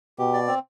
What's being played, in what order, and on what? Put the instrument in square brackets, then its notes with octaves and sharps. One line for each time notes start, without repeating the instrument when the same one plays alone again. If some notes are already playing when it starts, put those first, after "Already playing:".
[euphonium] B2 [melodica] G4
[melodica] D5
C4